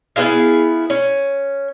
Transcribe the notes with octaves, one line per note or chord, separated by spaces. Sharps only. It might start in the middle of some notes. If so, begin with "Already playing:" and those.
B3 E4 G#4 F5
C#4